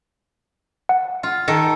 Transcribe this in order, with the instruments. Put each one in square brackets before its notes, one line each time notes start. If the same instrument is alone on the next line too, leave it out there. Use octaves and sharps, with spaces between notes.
[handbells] F#5
[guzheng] F4
D#3 A4